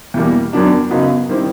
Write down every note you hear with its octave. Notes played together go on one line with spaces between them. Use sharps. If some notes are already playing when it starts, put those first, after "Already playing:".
E2 B2 G3 A#3
F#2 D#3 F#3 B3 D4
F#2 C#3 F#3 B3 D#4
D#3 G3 C4 E4